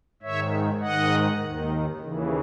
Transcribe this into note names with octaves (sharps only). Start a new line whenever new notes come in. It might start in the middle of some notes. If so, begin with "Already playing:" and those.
G#2 D#3 C#5 E5
G#2 D#3 D#5 F#5
D#2 D#3
D#2 C#3 E3